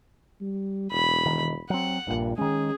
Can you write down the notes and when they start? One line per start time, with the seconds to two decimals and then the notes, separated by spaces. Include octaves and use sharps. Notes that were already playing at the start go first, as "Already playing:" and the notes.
0.40 G3
0.91 E1 B5
1.26 D#3
1.70 F#3 C4 F#5
2.07 A#1 G2 A#2
2.38 D#3 G#3 C#4 G#4